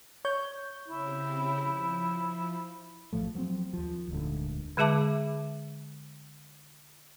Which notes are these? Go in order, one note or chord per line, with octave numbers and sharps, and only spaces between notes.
C#5 G6
C#3 C4 E4 G4
F3
A#1 A2 F3 A3
F3 F#3 A3 C4
D#2 F3
D#1 D2 G#2 D3
D3 G#3 G#4 E5 A5 D6